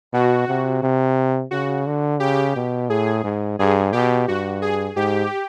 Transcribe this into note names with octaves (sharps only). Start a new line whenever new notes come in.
B2 F#4
C3
C3
C#3 F#4
D3
C#3 G4
B2
A2 G#4
G#2
G2 G#4
B2 G4
G2 F#4
G#4
G#2 G4